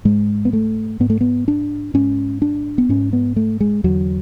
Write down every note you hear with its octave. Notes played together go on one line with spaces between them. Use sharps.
G#2 G#3
B3
A3
G#2 B3
A3
B3
D4
G#2 C#4
D4
B3
G#2 C#4
B3
A3
G#3
E2 D3 F#3